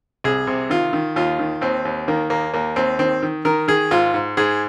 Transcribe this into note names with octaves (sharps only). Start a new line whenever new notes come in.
C2 G#4
C3
D#3 F4
D#3
D#2 F4
D#3
D#2 C4
D#2
D#3 A#3
D#2 A#3
D#2 A#3
D#2 C4
D#3 C4
D#3
D#3 A#4
D#3 G#4
G#2 F4
G#2
G#2 G#4